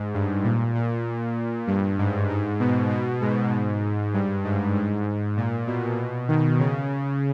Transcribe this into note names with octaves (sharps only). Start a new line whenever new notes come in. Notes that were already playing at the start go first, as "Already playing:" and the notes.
Already playing: G#2
G2
A#2
A#2
G2
G#2
G#2
B2
B2
G#2
G2
G#2
G#2
A#2
B2
D#3
C#3